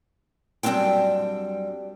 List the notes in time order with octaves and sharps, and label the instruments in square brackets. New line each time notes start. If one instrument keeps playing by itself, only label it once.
[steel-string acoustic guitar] F#2 G3 C4 D4 F4 G5